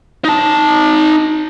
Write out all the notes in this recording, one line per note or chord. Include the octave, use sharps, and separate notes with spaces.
D#4 A5